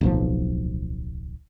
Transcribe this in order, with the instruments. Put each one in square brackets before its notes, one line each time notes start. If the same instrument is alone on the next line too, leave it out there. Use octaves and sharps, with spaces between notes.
[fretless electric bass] D1 B1 F3